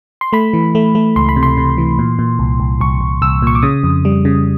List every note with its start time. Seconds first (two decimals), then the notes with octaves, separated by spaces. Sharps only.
0.21 C6
0.33 A3 B5
0.53 E3
0.75 A3
0.95 A3
1.16 C#2 C6
1.29 B5
1.36 C3
1.43 C6
1.57 C3
1.78 E3
1.99 A#2
2.19 A#2
2.39 C2
2.60 C2
2.81 C2 C#6
3.01 C2
3.22 C2 E6
3.42 A#2 C#6
3.55 D6
3.63 C#3 D#6
3.84 F2
4.05 G3
4.25 C#3